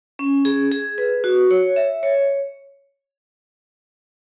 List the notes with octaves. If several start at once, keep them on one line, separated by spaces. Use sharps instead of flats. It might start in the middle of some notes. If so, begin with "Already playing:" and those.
C#4
G#4
G#4
B4
F#4
C#5
E5
C#5